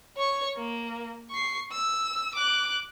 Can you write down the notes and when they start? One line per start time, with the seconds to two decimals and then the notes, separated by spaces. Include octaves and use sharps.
0.16 C#5 C#6
0.56 A#3
1.30 C#6 C7
1.72 E6
2.34 D6 F#6